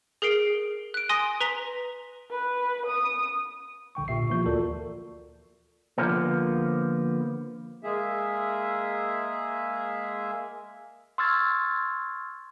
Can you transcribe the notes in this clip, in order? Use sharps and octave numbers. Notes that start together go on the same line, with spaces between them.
G#4 A#4 C7 D7
F#6 D7
G#5 C6 D#6 A#6
B4 A#5 B6 F7 G7
B4
D#6
A#1 D3 G5 C#6
A#2 G4 E5 C#6 C7
E3 F3 A#3 F4 C#6 G6
D2 F4 F#4 A4 A#4 D5
D3 F3 A#3 B3
G#3 A#3 G#4 E5
C6 C#6 E6 F6 G#6 A6